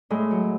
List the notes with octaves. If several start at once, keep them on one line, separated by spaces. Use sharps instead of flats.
A2 G#3
F#3